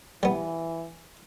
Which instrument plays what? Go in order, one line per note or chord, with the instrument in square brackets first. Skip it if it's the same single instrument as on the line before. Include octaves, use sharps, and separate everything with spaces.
[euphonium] E3 [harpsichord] G3 B3